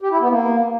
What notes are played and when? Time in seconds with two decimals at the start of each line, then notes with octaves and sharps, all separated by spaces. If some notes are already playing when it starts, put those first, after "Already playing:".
0.02 G4
0.11 E4
0.21 B3
0.30 A#3